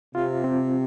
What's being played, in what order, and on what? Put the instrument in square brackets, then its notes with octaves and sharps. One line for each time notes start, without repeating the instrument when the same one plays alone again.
[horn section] C3 [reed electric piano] F4
[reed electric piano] C4